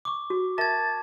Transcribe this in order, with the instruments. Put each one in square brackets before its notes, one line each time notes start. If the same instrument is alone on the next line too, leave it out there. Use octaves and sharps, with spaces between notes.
[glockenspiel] C#6 D6
[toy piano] F#4
[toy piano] A#4 E5 [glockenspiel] A5 G#6 [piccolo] A6